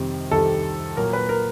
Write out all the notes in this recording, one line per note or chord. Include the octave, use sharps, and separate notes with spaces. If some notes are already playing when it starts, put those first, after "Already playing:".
Already playing: F2 C3 D#3 G3
F2 C3 D#3 G3 A4
A#2 F#3 A#3 A#4
B4
A#4